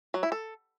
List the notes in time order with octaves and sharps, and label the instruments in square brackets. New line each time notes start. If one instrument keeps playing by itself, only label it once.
[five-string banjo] F#3
E4
A4